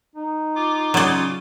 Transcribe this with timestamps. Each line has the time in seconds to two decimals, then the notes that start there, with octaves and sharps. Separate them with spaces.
0.15 D#4
0.55 F4 D6
0.94 C#3 F#3 D5